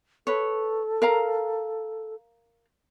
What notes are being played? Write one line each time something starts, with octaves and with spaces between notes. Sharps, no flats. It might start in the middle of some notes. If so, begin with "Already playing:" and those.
A4 B4 C#5
A#4 F5 A#5